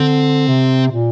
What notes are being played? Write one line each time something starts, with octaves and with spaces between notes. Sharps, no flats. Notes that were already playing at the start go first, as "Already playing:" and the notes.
Already playing: D3 C4
C3
A#2